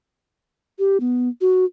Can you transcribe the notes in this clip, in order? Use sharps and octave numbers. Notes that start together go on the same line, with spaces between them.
G4
B3
F#4